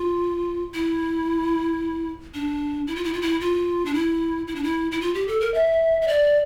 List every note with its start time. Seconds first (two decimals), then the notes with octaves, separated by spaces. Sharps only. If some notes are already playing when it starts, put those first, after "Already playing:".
Already playing: F4
0.74 E4
2.34 D4
2.87 E4
2.96 F4
3.04 E4
3.14 F4
3.22 E4
3.41 F4
3.85 D4
3.94 E4
4.47 E4
4.55 D4
4.63 E4
4.92 E4
5.01 F4
5.14 G4
5.28 A4
5.41 A#4
5.54 E5
6.02 E5
6.08 D5